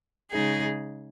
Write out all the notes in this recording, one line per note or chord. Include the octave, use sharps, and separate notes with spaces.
C#3 G#3 D#4 G#4